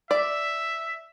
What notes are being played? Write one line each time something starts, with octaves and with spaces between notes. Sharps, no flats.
D5 E5